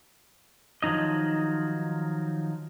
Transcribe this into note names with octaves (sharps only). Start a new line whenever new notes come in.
D#3 F3 F#3 D#4 D#5